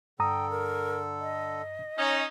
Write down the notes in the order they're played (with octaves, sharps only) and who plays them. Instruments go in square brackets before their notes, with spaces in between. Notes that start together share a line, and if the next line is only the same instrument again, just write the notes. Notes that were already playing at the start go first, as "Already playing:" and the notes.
[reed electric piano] G2 A#5 D#6 [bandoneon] D3 A4 [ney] G5
[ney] A#4
D#5
[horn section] C#4 D#4